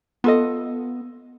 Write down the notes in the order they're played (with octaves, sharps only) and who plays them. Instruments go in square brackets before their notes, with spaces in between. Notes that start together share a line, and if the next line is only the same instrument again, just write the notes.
[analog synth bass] B3 [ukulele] F4 A4 D#5